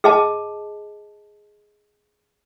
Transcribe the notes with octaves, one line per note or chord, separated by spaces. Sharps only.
G#4 D#5 A5